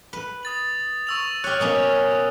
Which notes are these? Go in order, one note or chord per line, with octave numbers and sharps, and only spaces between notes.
B4
D#6 A6 F#7
C#6 E6 F7
G4 C#5 F6 F#6
B2 A#3 C#4 D#6